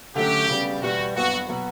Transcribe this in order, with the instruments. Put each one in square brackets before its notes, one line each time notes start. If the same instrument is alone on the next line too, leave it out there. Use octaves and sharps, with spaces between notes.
[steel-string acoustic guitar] D3 F#3 A3 C#4 F#4 [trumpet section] G4
[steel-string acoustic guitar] C#3 G3 B3
[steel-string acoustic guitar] E2 B2 G3 B3 [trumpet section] F#4
[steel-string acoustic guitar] G2 F#3 B3 [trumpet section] F#4
[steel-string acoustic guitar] B2 F#3 B3